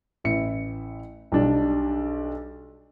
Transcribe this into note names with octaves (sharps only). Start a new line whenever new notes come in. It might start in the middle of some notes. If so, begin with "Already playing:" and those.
A1 E4 C#7
B1 G3 D4